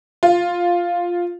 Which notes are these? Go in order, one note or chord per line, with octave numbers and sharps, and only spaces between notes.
F4